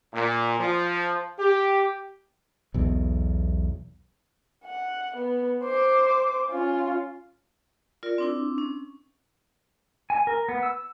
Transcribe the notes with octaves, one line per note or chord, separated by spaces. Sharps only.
A#2
F3
G4
B1 E2 B2
F#5
B3
C5 D6
C#4 F4
F4 A#4 D5
C4 D4 E4
C#4
G#5
A#4
B3
E6